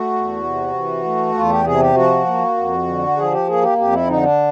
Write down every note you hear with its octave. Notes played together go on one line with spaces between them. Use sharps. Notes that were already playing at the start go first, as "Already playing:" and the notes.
Already playing: A3 F#4
E2
C3
E3
A3
E2 F4
G4
C3 G#4
G4
F3 F#4
A#3
F2
D3
F3 G#4
G4
A#3 G#4
G4
F2 G4
E4
D3 D#4
D4